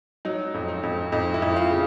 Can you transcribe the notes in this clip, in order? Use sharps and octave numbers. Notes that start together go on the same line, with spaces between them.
F#3 D#4
F2
D#4
F2
F2 D#4
E4
F2
F4
C#3